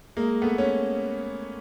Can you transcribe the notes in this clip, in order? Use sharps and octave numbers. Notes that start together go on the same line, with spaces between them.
G#3 A#3
A3 B3
C#4